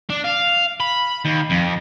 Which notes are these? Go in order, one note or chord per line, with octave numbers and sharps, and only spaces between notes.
D4
F5
B5
D#2
F2